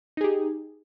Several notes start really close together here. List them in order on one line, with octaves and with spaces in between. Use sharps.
D#4 G#4 G4